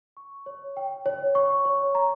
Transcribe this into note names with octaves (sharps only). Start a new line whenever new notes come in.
C#6
C#5
G5
C#5
C#6
C#5
A#5